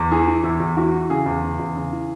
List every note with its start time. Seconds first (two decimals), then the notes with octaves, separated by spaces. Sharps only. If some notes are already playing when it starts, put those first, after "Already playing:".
Already playing: E2
0.12 E3 G#4
0.28 E3
0.44 E2 E4
0.60 E2
0.77 E3 F#4
0.94 E3
1.10 C#3 G#4
1.26 E2
1.43 C#3
1.60 E2
1.76 C#3
1.92 E3